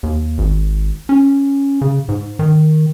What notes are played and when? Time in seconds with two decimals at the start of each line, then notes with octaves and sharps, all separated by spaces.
0.03 D#2
0.38 G#1
1.09 C#4
1.81 C#3
2.09 G#2
2.39 D#3